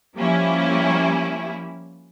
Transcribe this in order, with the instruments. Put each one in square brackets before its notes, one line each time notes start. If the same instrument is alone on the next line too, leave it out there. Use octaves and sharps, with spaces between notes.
[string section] F3 G3 A#3 C#4 E4